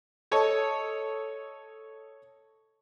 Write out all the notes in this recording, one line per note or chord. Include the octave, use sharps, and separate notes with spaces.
A4 C#5 D#5